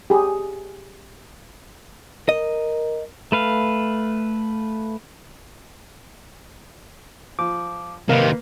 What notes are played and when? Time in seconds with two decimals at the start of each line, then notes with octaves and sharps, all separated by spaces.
0.10 G4 G#4
2.29 A#4 D#5
3.32 A3 B4 F5
7.39 F3 D6
8.09 C3 D#3 A#3 A#4 B4 F5